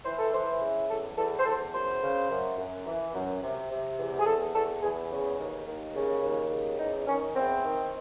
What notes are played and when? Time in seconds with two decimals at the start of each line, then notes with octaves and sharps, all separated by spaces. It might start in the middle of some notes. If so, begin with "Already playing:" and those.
0.05 E3 C5
0.18 A4
0.33 E3 C5
0.61 C#3
0.89 E2 A4
1.17 E2 A4
1.39 C5
1.45 E2 A4
1.73 F#2 C5
2.02 C#3
2.30 F#2
2.57 F#2
2.86 E3
3.14 F#2
3.42 C3
3.70 C3
3.98 E2
4.18 G#4
4.26 E2 A4
4.54 E2 A4
4.82 E2 G#4
5.11 C#3
5.38 D#2
5.66 D#2
5.95 C#3
6.23 D#2
6.51 C#3
6.79 E2 D#4
7.07 D#3 C#4
7.34 E2 C4
7.63 D#3